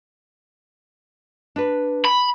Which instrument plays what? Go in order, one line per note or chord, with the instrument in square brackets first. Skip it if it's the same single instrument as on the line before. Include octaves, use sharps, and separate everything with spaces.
[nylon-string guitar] D4 B4
[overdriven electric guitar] B5